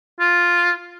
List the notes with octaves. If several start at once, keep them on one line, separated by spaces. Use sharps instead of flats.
F4